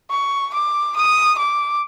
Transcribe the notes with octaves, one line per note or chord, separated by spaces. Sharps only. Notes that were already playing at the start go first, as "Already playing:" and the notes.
C#6
D6
D#6
D6